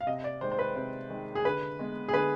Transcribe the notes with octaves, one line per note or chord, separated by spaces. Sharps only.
F5
C3 D#5
D5
D#3 G#3 C5
C5
B4
C3 C5
D#3 G#3
G#4
D3 B4
G#3 B3
G#4
D3 B4